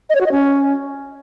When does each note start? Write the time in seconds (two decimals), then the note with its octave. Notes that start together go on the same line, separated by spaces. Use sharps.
0.10 D#5
0.15 C#5
0.21 F#4
0.26 D#5
0.32 C#4